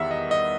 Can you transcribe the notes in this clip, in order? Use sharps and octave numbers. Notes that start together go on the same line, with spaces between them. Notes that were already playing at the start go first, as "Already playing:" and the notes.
Already playing: E2 D#3 G3 B3 E5 F#5
D#5
D#5